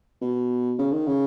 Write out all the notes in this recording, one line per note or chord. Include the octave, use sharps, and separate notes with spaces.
B2
C#3
D#3
C#3